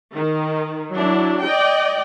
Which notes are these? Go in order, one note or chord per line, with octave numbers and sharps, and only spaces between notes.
D#3
F#3 D4 E4
D5 D#5 G5